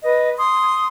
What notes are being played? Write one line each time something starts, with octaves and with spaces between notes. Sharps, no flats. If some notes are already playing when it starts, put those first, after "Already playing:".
B4 D#5
C6 D#6